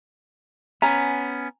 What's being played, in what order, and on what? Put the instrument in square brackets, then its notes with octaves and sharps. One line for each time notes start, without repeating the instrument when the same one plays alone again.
[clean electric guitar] B3 C#4 [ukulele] G#5 A#5